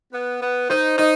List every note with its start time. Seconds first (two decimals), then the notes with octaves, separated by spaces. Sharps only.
0.13 B3
0.42 B3
0.69 D#4 C5
0.98 D#4 D#5